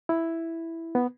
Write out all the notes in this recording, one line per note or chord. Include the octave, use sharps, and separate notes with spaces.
E4
B3